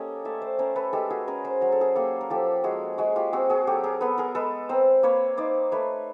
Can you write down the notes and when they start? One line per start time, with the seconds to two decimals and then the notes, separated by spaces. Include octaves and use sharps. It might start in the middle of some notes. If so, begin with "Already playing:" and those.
Already playing: A#3 C#4 G4 A4 C#5 D#5
0.25 A3 D5 E5
0.42 C5 D5
0.59 C#4 A#4 C5
0.76 A4 B4
0.93 G#3 G4 A4
1.10 F#4 G#4
1.28 C#4 G#4 A#4
1.44 A#4 C5
1.61 F#3 A#4
1.72 A4
1.81 G#4 A#4
1.95 A#3 G4 A4
2.21 A#4
2.30 F3 G4 A4
2.64 G#3 F#4 G#4
2.98 G#3 F#4
3.16 F4 G4
3.33 C4 F#4 G#4
3.50 F#4 G#4
3.67 F#3 G4 A4
3.84 G#4 A#4
4.01 B3 A4 B4
4.18 G#4 A#4
4.35 G#3 A4 B4
4.69 C4 A#4 C5
5.03 A#3 B4 C#5
5.37 D#4 C5 D5
5.72 A3 B4 C#5